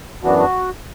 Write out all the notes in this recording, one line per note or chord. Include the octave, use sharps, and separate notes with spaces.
F#2 E3 B3 D4 F#4
F#4